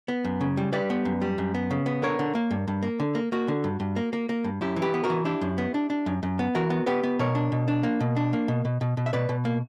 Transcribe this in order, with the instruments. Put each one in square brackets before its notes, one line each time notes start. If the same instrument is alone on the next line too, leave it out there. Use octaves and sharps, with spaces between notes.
[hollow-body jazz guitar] B3
F#2
C#3
G3
G3 B4 D5
B3
F#2
G3
F#2
B3
C#3
B3
D3 A#4 C#5
D3
A#3
G2
G2
A#3
D3
A#3
A#3 F#4
D3
G2
G2
A#3
A#3
A#3
G2
F#2 E4 G4
E3
G4 B4
B3
F#4 A#4
E3
D4 E4 G4
F#2
B3
D4
D4
F#2
F#2
B3
E3 F#4 A#4
B3
B3 G4 B4
B3
B2 A#4 C#5
D4
B2
D4
A#3
B2
D4
A#3
B2
B2
B2
B2
E5
B2 B4 D5
B2
A#3